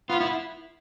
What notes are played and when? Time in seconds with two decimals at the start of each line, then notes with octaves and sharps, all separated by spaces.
0.09 B3 F4
0.20 E4